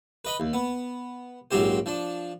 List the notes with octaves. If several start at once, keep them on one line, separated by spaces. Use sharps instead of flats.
B4 D#5 B5
D#2
B3
A#1 G#2 F#3 C4 G4 C5
F3 D4